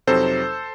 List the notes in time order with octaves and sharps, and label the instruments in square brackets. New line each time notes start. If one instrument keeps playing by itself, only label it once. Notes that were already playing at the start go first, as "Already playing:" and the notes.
[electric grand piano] F2 C3 F#3 C4 D#4 A4 C5